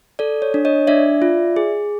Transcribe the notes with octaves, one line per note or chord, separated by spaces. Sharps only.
A4 D5
C#5
D4
C#5 D#5
D4 D5 E5
F4
G#4